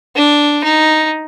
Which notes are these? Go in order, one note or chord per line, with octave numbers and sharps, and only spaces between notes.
D4
D#4